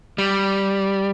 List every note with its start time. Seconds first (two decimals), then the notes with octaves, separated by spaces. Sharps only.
0.18 G3